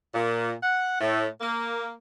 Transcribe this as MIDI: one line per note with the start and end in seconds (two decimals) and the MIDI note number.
0.13 0.53 46
0.62 1.00 78
1.00 1.26 45
1.41 1.91 58